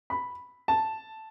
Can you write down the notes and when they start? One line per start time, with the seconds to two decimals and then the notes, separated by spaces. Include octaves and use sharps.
0.10 B5
0.68 A5